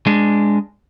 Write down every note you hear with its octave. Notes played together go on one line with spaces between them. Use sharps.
G#3 D4